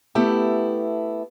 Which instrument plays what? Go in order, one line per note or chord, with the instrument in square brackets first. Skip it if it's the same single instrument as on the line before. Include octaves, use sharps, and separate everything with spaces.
[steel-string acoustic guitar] A3 B3 E4 G4 A4